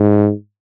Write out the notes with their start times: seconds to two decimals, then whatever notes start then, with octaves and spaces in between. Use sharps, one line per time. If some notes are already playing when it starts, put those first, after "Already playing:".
Already playing: G#2